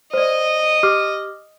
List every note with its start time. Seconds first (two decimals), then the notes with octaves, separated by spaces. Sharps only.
0.14 C5 D5 D#5
0.83 G4 D6 F6